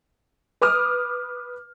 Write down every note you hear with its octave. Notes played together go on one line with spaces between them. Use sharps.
B4 D6 D#6 F6